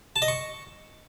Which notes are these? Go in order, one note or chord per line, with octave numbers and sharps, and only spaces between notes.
A5
D#5
C#6